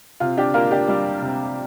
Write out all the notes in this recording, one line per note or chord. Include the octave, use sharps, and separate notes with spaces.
C3 F4
D4 G4
A#3 F4 A#4
D4 G4
G3 D4
C3